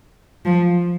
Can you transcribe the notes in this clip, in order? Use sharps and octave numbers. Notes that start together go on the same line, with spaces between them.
F3